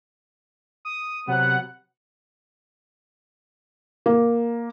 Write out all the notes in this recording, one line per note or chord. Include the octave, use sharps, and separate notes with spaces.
D#6
C3 F#3 B3 F#5
A#3